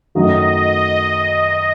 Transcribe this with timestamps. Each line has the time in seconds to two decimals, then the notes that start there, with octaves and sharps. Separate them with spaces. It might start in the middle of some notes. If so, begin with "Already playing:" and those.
0.15 F#2 D#3 F#3 A3 D#5